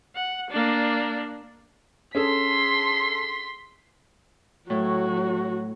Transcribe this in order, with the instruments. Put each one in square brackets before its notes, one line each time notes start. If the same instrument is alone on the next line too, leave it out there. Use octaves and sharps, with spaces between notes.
[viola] F#5
A#3 D4
[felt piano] C#4 G#4 A4 [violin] C6 B6
[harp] A2 E4 [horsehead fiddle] F#3 F#4